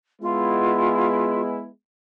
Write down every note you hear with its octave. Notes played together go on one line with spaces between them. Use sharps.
G#3 B3 E4 F4